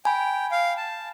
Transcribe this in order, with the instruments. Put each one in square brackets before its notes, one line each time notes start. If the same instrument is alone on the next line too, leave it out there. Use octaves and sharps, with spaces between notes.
[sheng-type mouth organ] G5 [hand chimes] G#5 B5
[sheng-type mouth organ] F5
A5